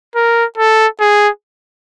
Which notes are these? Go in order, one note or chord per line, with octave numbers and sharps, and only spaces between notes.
A#4
A4
G#4